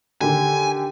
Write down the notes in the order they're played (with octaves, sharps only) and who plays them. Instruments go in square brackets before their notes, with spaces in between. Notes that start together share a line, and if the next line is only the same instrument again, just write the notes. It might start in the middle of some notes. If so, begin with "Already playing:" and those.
[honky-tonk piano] D3 D#3 [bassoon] G4 [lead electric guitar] G#5